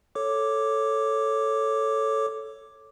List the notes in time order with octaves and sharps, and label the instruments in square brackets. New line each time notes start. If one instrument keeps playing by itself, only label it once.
[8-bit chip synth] A4 C#5 D6